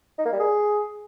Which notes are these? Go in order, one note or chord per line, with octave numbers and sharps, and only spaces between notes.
D#4
A#3
G3
G#4